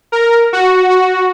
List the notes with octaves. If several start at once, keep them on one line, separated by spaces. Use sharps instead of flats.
A#4
F#4
F#4